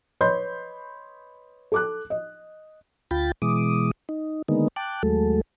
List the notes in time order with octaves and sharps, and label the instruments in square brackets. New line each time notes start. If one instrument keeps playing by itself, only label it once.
[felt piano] B4 C#5 D#5 B5 C6 G6
A4 D6 F#6
D#5
[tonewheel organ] D2 F4 G5 B5 A6
B2 E3 G#3 D6 D#6
D#4
D3 D#3 G#3 A#3 B3 D#4
G5 A5 D6 F#6
D#2 F#3 G#3 A3 A4